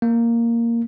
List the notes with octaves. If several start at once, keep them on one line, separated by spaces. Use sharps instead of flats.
A#3